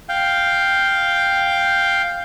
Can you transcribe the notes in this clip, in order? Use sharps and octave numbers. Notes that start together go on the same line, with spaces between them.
F5 G5